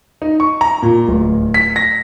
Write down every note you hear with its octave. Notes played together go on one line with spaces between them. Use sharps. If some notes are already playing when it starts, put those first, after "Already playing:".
D#4
C#6
A#5
A#2
D1
B6
A#6